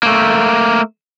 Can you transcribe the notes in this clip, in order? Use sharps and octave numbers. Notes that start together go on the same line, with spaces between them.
A3 A#3